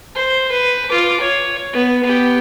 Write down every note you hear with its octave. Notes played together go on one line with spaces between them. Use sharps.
C5
B4
F4 D6
C#5
B3
B3 G4